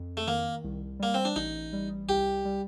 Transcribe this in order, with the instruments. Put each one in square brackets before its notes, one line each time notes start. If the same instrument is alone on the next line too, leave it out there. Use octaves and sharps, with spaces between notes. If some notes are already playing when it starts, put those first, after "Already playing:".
Already playing: [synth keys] F2
[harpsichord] A3
[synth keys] D#3 [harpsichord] A#3
[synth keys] C2
[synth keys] G3 [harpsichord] A#3
[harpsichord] C4
D4
[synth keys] A1 [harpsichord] D#4
[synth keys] G3
[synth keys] C2 [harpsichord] G4
[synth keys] G3